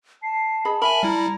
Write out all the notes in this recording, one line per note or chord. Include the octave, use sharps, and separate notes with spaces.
A5 C7
G#4 D#5 B5
A#4 E5 G#5 B5 F#7
G3 E4 A#5